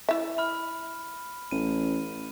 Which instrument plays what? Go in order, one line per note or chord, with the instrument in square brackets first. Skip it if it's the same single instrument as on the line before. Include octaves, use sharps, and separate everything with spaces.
[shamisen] E4 E5
[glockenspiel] B5 F6
[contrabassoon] A1 [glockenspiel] D#7